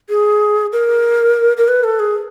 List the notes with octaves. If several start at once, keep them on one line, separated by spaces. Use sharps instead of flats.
G#4
A#4
A#4
B4
A4
G#4